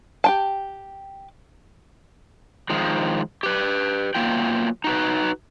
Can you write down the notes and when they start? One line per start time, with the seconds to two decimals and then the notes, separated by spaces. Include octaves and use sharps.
0.24 G4 G5 A5
2.70 D#3 F3 G#3
3.43 G4 B4
4.15 F#3 A#3 B3 F4 G5
4.84 D#4 F#4 B4